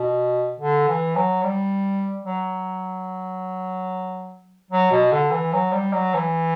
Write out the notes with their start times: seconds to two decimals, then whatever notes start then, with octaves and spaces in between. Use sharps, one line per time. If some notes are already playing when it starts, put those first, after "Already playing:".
Already playing: B2
0.60 D3
0.89 E3
1.16 F#3
1.43 G3
2.25 F#3
4.71 F#3
4.91 B2
5.12 D3
5.32 E3
5.53 F#3
5.73 G3
5.93 F#3
6.14 E3